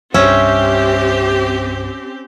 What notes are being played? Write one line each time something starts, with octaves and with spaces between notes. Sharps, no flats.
C2 G2 C4 C#4 G4 E5